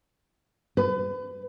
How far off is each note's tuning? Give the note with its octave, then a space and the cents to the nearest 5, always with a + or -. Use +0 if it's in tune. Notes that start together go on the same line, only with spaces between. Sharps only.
B4 +35